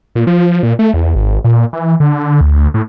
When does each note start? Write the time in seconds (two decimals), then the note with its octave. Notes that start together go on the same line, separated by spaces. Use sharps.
0.15 A#2
0.27 F3
0.63 A#2
0.79 A3
0.94 E2
1.15 G#1
1.44 A#2
1.73 E3
2.00 D3
2.41 D2
2.74 A2